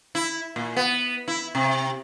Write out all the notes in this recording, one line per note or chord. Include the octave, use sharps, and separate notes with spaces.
E4
A#2
B3
E4
C3